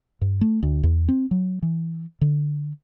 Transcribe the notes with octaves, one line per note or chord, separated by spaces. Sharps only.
G2
A3
D2
E2
C4
F#3
E3
D3